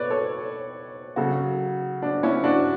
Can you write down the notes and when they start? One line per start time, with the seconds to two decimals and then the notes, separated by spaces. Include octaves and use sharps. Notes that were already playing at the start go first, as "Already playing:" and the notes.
Already playing: B2 A4 B4 C#5 D5
0.10 A4 C#5
1.16 C#3 F#3 F#4 A4
2.02 D4
2.23 C#4 E4
2.44 D4 F#4